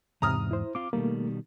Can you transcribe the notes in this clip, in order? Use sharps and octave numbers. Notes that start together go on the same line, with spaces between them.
E2 G#2 C3 A#5 D#6 F6
E4 C5
C4 F4 D6
B2 D#3 G3 A3 A#3